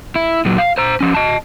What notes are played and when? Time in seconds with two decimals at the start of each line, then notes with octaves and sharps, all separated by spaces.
0.16 E4
0.45 A#2 F#3
0.58 F5
0.78 C5 A#5
1.00 F3 C#4
1.14 D#5 A5